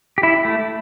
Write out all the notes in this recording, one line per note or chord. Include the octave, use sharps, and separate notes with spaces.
G4
E4
A3